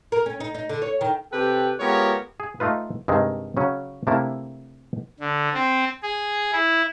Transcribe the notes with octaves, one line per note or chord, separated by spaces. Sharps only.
A#4
C#4
D#4
D#4
D3
C#5
D#3
C3 G4 A4 B4 G5
G#3 B3 F4 G4 A#4 C#5
G#4
A3 D#4 F4 B4
G2 C3 D#3 G#3
C#3 F#3 C#4
C3 A3 A#3 D4 E4
D3
C4
G#4
E4